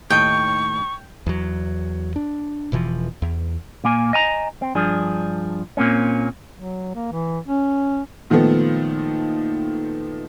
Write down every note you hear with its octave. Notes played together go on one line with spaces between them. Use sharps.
D#2 A2 D#5 G5 C#6
E2 F#3
D4
E1 B2 E3 F3
E2
A#2 A#3 G#5
D#5 G#5 A#5
C4
G2 F3 D4 G#4
A#2 A#3 C4 C#4
F#3
A#3
E3
C#4
A#2 D#3 F3 A3 B3